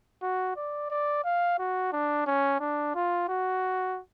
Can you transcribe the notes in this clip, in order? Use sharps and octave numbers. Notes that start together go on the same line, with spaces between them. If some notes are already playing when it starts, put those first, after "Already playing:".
F#4
D5
D5
F5
F#4
D4
C#4
D4
F4
F#4